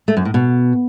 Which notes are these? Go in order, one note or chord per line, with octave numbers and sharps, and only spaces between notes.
A3
F#2
A2
B2